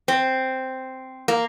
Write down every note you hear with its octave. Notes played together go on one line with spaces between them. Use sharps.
C4
A#3